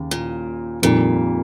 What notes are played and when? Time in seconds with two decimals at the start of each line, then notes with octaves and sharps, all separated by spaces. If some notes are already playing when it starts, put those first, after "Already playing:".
Already playing: D#2 C#3
0.11 A#2
0.82 F2 A#2 D#3 G3 A#3